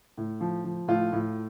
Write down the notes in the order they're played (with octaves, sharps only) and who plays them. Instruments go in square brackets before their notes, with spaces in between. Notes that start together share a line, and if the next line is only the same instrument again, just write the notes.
[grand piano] A2
F3
F3
A2 F4
A2